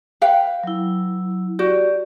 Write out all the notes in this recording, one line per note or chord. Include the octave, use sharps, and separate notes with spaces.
B4 F5 G5
F#3 E4
F#4 G4 D5